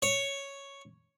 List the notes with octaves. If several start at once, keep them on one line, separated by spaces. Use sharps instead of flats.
C#5